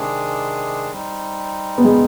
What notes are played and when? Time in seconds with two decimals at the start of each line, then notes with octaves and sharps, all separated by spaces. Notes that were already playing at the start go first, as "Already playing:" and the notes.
Already playing: C3 D#3 G#3 D4 G#4
0.92 G3 C4 D#4
1.78 B3
1.84 G#3